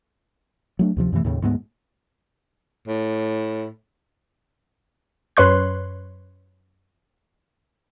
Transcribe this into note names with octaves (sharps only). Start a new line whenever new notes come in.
F#3 A3 D4
D2 C3 F3
F#2 C3 E3 A3
D#2 A2 C#3
D2 G#2 G#3 B3
A2
F#2 B4 C#5 C6 F#6